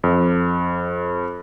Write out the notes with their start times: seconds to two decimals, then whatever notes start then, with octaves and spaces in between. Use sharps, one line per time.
0.04 F2